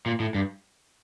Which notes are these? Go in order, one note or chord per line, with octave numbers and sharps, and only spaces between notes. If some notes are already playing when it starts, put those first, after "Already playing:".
A#2
A2
G2